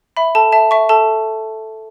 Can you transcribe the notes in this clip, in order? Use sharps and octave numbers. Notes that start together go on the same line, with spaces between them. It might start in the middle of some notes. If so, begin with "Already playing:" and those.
E5 B5
A4 A5
E5 A5
E5 C#6
A4 A5